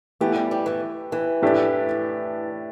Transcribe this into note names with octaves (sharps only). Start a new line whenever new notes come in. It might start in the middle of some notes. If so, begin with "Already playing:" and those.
E3 A3 B3 G4
G3
G3
E3
E3
A2 A3 D4 G4